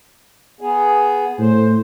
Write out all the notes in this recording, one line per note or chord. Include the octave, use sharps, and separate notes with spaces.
B3 G#4
A2 C5